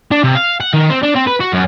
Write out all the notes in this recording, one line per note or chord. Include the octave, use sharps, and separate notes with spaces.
D4
C3
F5
F#5
D#3
C4
D4
C4
B4
F#4
F#2